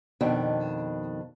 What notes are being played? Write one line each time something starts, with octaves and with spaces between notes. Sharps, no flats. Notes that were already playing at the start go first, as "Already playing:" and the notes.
F2 B2 D#3 D4